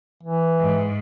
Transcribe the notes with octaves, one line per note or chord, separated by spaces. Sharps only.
E3
G#2